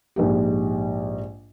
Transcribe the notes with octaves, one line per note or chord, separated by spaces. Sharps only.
A#1 G#2 G4